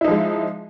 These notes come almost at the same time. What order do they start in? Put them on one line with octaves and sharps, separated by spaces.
E4 D#4 F3 G#3